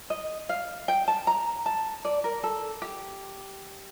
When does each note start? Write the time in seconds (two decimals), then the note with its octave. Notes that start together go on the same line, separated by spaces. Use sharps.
0.10 D#5
0.49 F5
0.88 G5
1.08 A5
1.27 A#5
1.66 A5
2.05 D5
2.24 A#4
2.43 A4
2.82 G4